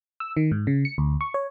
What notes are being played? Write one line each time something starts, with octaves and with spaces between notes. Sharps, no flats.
E6
D#3
G#2
C#3
C#7
D2
C#6
C#5